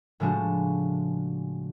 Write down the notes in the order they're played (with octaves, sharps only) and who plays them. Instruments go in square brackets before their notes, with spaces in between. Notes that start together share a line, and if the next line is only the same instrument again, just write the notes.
[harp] A2 C#3 F3 G#3 D4 F#4